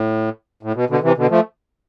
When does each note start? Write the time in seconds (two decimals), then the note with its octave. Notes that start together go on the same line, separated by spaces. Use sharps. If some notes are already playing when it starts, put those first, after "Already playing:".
Already playing: A2
0.63 A2
0.75 B2
0.90 B2 D3
1.03 C3 E3
1.17 B2 D3
1.30 F3 A3